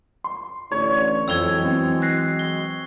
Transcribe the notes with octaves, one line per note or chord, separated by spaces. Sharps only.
C6
A1 D3 C#5 D5
F2 E3 F#3 G#3 E6 G#6 F7 G7
C4
F#6 A#6 C7
G7